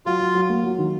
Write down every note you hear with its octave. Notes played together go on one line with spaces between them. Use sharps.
F#3 F4
F#3
F#3
A#3
F#3
D#3